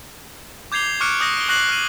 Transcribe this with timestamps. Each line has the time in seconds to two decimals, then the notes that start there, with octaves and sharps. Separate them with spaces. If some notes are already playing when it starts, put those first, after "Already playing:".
0.72 D6 G6 G#6 C7 F7 G7
1.00 C#6 D6 F6 F#6 C#7 D7
1.20 D6 D#6 G6 A#6
1.37 D7 G7
1.48 C#6 D6 F#6 A#6 C7 F#7
1.69 F6 F#6 D#7 F#7